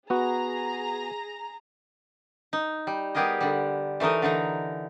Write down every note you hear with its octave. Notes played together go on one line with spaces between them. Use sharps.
B3 F#4 G#4 A#5
D#4
G3
G3 B3 G4 G#4 A#4 D#5
D3 G3
E3 A3 D#4 A#4 D#5
D3 E3 D#4 A#5